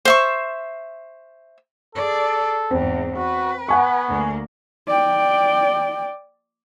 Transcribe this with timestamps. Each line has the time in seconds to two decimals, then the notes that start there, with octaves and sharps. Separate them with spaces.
0.05 C5 E5 C#6
1.95 G#4 A4 D5
2.71 E2 G#2 C4
3.17 F#4 B4
3.69 B3 F#5 G#5 C#6
4.08 D2 A#3
4.88 D5 G5